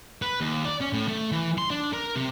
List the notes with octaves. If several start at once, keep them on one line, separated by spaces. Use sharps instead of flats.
B4
D#2
D5
C#4
A2
A3
E3
C6
D4
A#4
C3